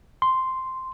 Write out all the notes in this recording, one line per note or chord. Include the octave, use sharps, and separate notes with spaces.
C6